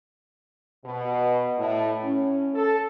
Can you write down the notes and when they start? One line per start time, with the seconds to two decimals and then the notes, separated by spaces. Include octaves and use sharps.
0.85 B2
1.59 A2
2.03 C#4
2.54 A4